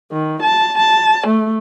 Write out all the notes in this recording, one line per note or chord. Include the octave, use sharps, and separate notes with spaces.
D#3
A5
A5
A3